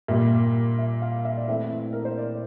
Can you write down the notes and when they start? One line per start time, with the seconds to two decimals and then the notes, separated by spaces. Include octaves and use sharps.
0.08 A#2 G3 A#3 E5
0.78 E5
1.02 F5
1.25 E5
1.37 D5
1.48 E3 A3 C4 E5
1.93 A#4
2.05 C5
2.18 D5